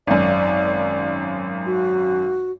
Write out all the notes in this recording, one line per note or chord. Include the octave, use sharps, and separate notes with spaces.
G#1 F#2 D5
F#4